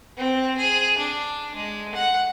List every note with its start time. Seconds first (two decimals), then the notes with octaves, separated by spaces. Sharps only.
0.17 C4
0.57 G#4
0.98 D4
1.55 G#3
1.95 F#5